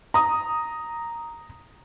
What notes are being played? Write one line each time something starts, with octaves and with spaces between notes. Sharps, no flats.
A#5 D#6